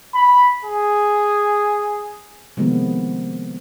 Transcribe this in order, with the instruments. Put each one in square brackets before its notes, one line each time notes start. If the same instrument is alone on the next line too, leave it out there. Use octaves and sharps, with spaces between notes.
[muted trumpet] B5
G#4
[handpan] C3 D#3 F3 G#3 A#3 B3